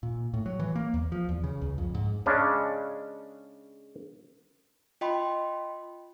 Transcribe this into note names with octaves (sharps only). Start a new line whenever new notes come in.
A#2
A2
F#3
E3
A#3
E2
F3
E2
C#3
C#2
F2
G#2
C#3 G#3 C#4 D4
F4 D#5 G5 B5 C6